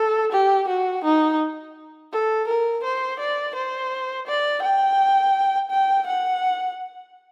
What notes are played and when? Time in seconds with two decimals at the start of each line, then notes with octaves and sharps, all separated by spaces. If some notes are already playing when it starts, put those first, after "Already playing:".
Already playing: A4
0.32 G4
0.68 F#4
1.04 D#4
2.12 A4
2.48 A#4
2.84 C5
3.19 D5
3.55 C5
4.27 D5
4.62 G5
5.71 G5
6.07 F#5